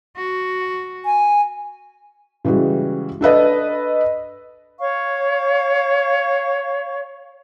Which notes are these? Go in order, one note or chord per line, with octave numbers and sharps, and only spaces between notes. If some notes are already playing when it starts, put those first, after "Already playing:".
F#4
G#5
C#3 E3 G3 G#3 F#4
D4 A4 B4 D#5
C#5 F5 C#6